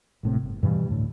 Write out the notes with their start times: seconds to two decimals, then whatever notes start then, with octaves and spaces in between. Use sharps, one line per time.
0.23 G#1 A2 C3
0.42 G1
0.63 G2 B2 E3 G3
0.88 D2 A2